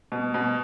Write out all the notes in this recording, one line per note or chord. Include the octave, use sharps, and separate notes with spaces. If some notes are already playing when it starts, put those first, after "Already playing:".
B2
B2